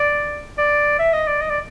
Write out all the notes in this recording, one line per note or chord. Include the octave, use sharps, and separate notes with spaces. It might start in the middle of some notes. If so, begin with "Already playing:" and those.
Already playing: D5
D5
E5
D#5
D5
D#5
D5